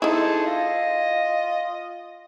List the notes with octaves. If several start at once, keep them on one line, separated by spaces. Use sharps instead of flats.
D#4 E4 G#4 A4 C5
F4 D#5